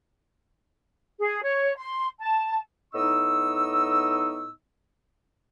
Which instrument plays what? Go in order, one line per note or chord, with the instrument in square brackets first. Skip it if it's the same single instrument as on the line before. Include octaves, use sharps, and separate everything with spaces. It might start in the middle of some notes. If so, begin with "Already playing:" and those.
[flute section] G#4
C#5
C6
A5
[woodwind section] A2 B3 D#4 D#5 C#6 E6